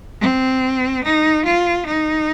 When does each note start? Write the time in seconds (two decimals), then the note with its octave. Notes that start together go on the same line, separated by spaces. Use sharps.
0.21 C4
1.04 D#4
1.45 F4
1.86 D#4